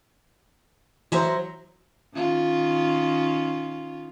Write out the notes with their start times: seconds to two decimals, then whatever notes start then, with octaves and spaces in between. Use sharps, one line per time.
1.12 E3 F#3 C5 E5 A#5
2.15 D#3 C#4 F4